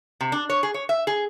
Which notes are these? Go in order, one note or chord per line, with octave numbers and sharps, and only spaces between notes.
C3
D4
C#5
G#4
C#5
E5
G#4